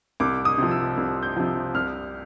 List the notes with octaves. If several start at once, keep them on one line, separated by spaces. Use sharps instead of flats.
C2 D6
D#6
C3 F3
E6
C2
G6
C3 F3
C2 F6